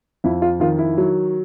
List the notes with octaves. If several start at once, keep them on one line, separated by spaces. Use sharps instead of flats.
F2 E4
F4
D#3 F4
E4
F#3